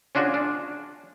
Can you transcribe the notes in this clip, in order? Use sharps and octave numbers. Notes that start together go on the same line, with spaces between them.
C#4 D4 F4 F#4 G#4
D4